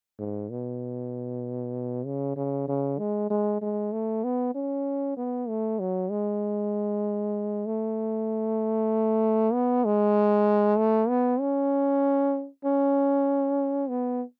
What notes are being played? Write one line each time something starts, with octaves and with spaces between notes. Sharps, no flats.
G#2
B2
C#3
C#3
C#3
G#3
G#3
G#3
A3
B3
C#4
B3
A3
F#3
G#3
A3
B3
G#3
A3
B3
C#4
C#4
B3